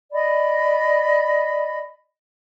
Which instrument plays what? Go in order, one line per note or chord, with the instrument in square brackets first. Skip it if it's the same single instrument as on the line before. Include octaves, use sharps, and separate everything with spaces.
[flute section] D5 D#5 B5